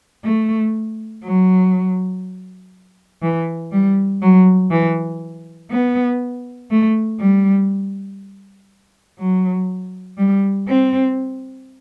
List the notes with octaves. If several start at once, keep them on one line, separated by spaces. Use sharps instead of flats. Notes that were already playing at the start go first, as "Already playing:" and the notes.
A3
F#3
E3
G3
F#3
E3
B3
A3
G3
F#3
G3
C4